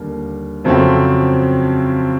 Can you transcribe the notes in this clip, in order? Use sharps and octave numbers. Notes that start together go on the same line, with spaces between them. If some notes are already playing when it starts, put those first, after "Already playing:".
Already playing: D#2 D3 G3 A#3
F2 C#3 F#3 A3 C4